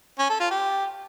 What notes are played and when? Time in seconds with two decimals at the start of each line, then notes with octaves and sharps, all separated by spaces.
0.19 C#4
0.29 A4
0.40 F4
0.51 G4